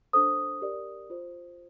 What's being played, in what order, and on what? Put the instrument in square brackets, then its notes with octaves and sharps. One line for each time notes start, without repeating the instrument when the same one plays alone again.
[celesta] D4 A4 C5 D#6
G4 A#4 D5
F4 C5